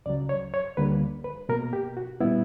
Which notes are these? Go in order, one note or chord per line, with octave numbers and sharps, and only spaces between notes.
C#2 C#3 F#3 D5
C#5
C#5
D2 D3 G3 A#3 B4
B4
B2 A#3 A#4
G4
F#4
A#2 G3 B3 E4